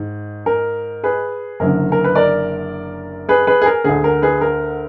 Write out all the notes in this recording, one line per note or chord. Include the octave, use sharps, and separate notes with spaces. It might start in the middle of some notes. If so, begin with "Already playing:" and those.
Already playing: G#2 D#3
A#4
G#4 B4
F#1 F#2 D3 A#4
A#4
B4
A#4 D5
G#4 B4
G#4 B4
G#4
A#4
D2 D3 G#4
A#4
G#4 B4
A#4